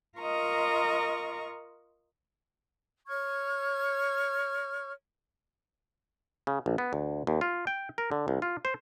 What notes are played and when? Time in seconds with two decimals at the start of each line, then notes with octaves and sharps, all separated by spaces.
0.18 F4 A#4 D#5 A#5 C#6
3.08 C#5 C#6 F6 G#6
6.47 C#3
6.66 A#1
6.78 B3
6.93 D2
7.27 D#2
7.41 F4
7.67 G5
7.98 A#4
8.12 D3
8.28 C2
8.42 F4
8.65 C5